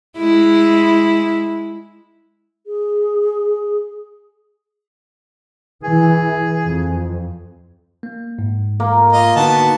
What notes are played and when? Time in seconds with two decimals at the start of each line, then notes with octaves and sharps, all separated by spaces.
0.18 G#3 E4
2.67 G#4
5.84 E3 G#4
6.67 F2
8.03 A#3
8.39 G#2
8.80 A#3
9.13 F4 D#5
9.36 D3 B3 D#4 F#4 A5